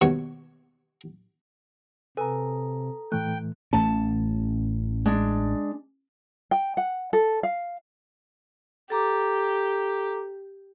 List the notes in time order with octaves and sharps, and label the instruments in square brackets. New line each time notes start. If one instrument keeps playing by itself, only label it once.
[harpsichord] D#2 B2 C#5 C#6
[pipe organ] C3 [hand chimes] A4 A#5 [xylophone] B4 G#5 E6
[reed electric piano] A2 E3 A3 [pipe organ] G5 [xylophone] F#6
[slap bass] A1 A3 C#4 [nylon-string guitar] A5
[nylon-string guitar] G#3 D4
[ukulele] G5
F#5
A4
F5
[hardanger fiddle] G4 [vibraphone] A4 A#5 D6